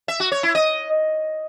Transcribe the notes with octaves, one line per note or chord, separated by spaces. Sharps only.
E5
F#4
C#5
E4
D#5